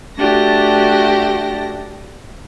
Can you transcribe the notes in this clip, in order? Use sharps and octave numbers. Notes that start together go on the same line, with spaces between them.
A3 D4 F#4 G4 A#6